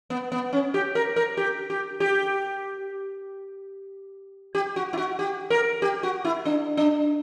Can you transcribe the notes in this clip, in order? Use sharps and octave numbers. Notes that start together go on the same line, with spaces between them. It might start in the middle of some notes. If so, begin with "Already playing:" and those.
B3
B3
C#4
G4
A#4
A#4
G4
G4
G4
G4
F#4
E4
F#4
G4
A#4
G4
F#4
E4
D4
D4